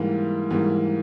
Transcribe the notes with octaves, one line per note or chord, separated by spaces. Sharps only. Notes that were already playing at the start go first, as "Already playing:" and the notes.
Already playing: G#2 E3 G3 A#3
G#2 E3 G3 A#3